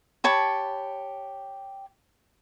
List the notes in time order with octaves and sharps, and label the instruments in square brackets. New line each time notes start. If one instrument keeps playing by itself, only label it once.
[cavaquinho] G4 C#5 A5 B5